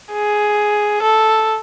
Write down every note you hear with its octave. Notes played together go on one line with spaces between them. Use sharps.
G#4
A4